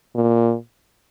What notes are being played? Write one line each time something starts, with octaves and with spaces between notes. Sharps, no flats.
A#2